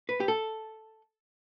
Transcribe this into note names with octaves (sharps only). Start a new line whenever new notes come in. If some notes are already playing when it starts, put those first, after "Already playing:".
B4
G4
A4